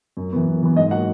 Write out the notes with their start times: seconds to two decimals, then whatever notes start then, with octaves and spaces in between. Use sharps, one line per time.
0.17 F#2
0.32 E3 B3
0.47 F#2
0.63 E3 B3
0.76 G#2 D#5
0.91 F#3 A#3 F#5